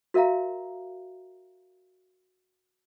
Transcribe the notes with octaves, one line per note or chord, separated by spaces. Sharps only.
F#4 A#4 E5 F5 A#5